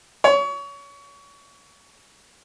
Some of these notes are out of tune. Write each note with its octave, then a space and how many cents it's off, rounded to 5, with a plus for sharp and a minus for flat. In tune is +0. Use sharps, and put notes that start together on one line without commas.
C#5 +30